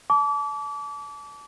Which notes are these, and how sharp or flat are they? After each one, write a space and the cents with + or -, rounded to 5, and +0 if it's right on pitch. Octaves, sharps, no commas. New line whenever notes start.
A5 -30 D6 -30